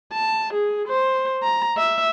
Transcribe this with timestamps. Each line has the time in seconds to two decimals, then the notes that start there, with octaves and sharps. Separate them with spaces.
0.13 A5
0.54 G#4
0.88 C5
1.43 A#5
1.77 E5